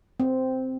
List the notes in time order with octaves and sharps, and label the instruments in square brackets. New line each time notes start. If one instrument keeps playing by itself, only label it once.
[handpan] C4